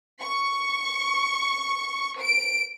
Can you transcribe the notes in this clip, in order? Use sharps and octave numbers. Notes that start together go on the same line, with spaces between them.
C#6
D7